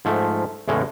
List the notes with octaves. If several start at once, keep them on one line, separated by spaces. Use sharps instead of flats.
G#2 F3 A3
E2 A2 C#3 G#3